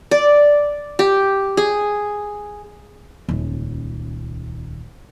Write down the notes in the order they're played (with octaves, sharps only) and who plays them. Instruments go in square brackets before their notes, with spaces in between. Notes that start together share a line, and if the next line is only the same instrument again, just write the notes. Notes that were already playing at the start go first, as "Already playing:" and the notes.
[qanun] D5
G4
G#4
[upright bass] D#1 C#2